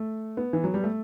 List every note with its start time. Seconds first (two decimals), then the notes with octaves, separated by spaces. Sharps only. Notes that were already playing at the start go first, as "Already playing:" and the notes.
Already playing: A3
0.37 B3
0.53 E3
0.64 F#3
0.74 G3
0.83 A3